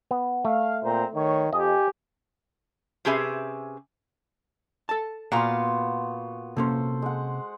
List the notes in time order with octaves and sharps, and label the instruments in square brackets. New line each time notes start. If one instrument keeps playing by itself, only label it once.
[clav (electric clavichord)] B3
[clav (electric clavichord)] A3 [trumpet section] F5
[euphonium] A#2 [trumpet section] C4 C5 A#5
[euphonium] D#3 [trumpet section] C#5
[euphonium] F2 [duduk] G4 [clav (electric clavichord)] D#5 [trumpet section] G#5
[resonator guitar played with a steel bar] C3 C#4 G4 G#4 B4 E5
[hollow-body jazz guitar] A4 A5
[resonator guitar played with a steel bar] A#2 B3 F5 [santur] F#4 C6
[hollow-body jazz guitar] C3 A#3 C#4 [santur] A4 C5
[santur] G#3 F#5